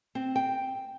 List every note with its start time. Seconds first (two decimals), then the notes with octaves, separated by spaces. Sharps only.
0.15 C4
0.36 G5